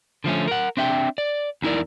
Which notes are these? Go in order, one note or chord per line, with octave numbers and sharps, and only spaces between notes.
D3 F3 A3 C#4
A#4 F#5
C4 D4 E5 F#5 G5
D5
E2 D#4 E4 A#4 D5